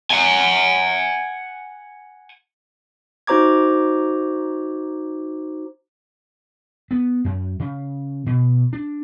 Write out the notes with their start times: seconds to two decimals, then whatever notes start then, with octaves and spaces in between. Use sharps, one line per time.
0.11 F#5 G#5
3.27 D#4 F#4 C5 A#5 D6 G#6
6.91 B3
7.24 F#2
7.60 C#3
8.26 B2
8.73 D4